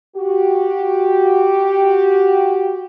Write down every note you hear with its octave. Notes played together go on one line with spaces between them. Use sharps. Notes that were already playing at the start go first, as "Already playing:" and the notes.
F#4 G4